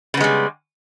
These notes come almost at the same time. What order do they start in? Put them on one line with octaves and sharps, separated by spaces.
C#3 B3 G#3 G3